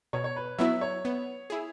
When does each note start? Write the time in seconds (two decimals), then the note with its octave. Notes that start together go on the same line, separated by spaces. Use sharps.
0.13 B2 C#5
0.24 C#5
0.36 B4
0.58 F#3 B3 E4 E5
0.81 C#5
1.05 B3
1.50 E4 G#4